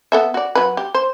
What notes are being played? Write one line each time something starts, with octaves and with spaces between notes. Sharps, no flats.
B3 A4 E5
F#4 D5
F#3 B4
G4
C5